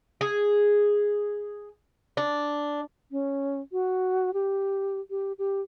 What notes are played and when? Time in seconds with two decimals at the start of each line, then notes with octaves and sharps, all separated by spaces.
0.21 G#4
2.17 D4
3.11 C#4
3.72 F#4
4.34 G4
5.10 G4
5.39 G4